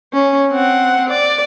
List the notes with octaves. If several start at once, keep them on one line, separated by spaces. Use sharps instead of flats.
C#4
C4 F#5
D5